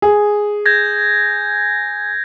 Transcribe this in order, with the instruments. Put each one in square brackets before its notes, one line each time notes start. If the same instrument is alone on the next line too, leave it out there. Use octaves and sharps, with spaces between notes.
[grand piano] G#4
[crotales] G6 G#6 A#6